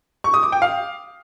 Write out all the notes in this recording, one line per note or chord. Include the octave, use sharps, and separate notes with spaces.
C#6
D#6
D6
G5
F5